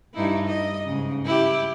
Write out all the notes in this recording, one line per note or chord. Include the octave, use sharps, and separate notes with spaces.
G2 D#4 E4
D#5
G#2 C#3
E4 G4